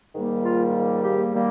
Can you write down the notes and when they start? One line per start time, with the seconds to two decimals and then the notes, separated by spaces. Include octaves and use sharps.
0.15 G#2 D#3 G3 A#3
0.44 F4
1.04 G4
1.34 D#3 G3 A#3